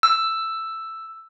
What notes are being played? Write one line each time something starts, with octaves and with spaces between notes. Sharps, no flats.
E6